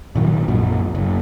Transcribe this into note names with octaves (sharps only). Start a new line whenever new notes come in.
A#2 D#3 F#3
A#1 F#2 A#2
F#1